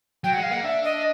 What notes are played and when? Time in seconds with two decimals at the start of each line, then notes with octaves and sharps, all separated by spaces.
0.24 F#3 G5
0.33 G#3 F#5
0.43 F5
0.51 A#3 F#5
0.64 D4 E5
0.84 D#5